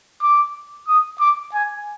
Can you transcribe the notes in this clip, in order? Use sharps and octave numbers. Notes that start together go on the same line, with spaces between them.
D6
D#6
D6
G#5